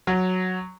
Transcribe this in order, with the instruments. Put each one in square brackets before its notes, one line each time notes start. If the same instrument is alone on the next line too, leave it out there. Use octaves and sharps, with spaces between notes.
[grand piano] F#3